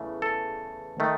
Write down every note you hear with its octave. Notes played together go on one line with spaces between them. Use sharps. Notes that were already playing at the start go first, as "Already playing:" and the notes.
Already playing: E2 C#3 E3 A3
A4
D#3 A3